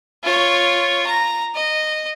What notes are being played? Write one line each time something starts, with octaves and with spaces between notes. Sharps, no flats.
F4 C#5
A#5
D#5